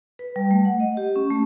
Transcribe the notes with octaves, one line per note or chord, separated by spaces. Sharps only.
B4
G3
A3
F#5
D#5
G4
C#4
A3